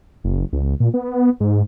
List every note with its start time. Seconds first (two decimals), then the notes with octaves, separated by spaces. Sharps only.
0.24 F#1
0.53 C#2
0.80 A#2
0.94 B3
1.40 G#2